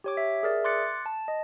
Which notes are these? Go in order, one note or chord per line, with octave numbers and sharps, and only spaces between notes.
G4 C#5 D6
E5
G#4 A#4 D5 E5
C6 D6 F#6 A6 C#7
A5
D#5